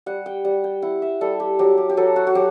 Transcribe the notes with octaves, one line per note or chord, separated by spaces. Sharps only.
G3 F#5
G5
G3 F#5
G5
E4 F#5
E5
G3 A4
G4
F#3 G4
G4
G4
F#3 A4
F#4
F#4
F#3 G4